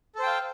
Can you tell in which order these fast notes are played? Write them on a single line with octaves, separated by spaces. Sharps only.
A4 C5 G5 F5